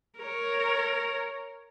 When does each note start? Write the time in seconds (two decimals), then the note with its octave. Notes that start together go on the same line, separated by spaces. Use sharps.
0.20 A#4 C#5